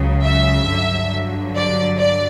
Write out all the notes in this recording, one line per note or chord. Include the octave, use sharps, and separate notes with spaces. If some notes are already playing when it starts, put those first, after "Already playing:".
Already playing: C#2 C#3 F#3
E5
G2 D3 F#3
D5
D5